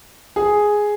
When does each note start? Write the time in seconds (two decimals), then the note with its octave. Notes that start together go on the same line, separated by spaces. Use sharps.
0.36 G#4